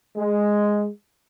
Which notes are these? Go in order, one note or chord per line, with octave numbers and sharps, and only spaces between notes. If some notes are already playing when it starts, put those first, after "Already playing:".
G#3